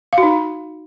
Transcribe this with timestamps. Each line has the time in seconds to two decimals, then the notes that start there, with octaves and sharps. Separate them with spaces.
0.13 F5
0.18 F#4
0.23 D#4